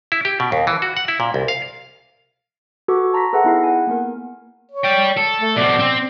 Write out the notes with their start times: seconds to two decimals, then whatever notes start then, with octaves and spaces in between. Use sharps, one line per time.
0.12 E4
0.25 G4
0.40 B2
0.52 D#2
0.67 E3
0.82 F#4
0.97 F#5
1.08 E4
1.20 A#2
1.34 C2
1.48 F5
2.88 F#4 A4 B4 F#5 C#6 D6
3.13 A5 A#5 C6 A#6 B6
3.33 G#4 A4 B4 E5 F#5
3.44 B3 D#4 E4 G#4 B5 C7
3.63 F#5 G#5
3.87 A#3 B3 A#4
4.72 C#5
4.84 D5 G5
5.17 A4
5.41 A3
5.56 B2 C4 D5
5.79 C4